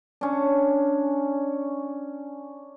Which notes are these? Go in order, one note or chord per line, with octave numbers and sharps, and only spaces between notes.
C#4 D4